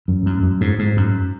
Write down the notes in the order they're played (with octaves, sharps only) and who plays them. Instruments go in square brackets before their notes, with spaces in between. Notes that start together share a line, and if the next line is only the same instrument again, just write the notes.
[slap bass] F#2
F#2
F#2
G#2
G#2
F#2